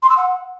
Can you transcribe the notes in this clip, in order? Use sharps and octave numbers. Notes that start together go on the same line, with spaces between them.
C6
E6
F#5